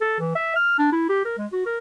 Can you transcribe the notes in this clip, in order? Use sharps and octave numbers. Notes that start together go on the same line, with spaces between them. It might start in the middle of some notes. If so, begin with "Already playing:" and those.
A4
E3
E5
F6
D4
E4
G4
A#4
G#3
F#4
A#4